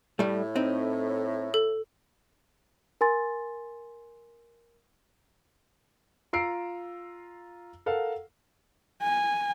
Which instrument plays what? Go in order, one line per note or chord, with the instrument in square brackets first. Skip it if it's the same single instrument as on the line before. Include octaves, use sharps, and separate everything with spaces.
[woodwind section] A2 [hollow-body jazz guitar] G3 A3
[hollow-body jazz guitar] C4 D#4
[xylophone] A4
[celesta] A#4 G#5 C6 A6
[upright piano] F4 A#5 E6 C7 D7
A4 A#4 F5 F#5
[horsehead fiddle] G#5